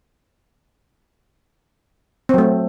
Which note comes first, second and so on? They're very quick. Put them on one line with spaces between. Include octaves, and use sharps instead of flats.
C4 F#3 A3